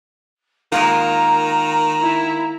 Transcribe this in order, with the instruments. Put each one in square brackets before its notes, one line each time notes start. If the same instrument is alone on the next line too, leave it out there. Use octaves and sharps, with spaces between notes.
[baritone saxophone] D#3 [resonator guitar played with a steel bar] G#3 A#3 F4 [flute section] A#5
[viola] E4